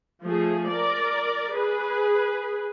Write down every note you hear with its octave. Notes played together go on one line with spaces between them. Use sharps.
F3 A3 G#4
A#4 D5
G#4 B4